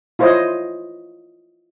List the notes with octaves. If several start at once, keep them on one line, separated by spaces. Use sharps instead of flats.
E4 F4 C5 C#5 D#5